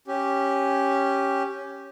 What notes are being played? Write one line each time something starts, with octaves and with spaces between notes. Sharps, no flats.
C#4 G4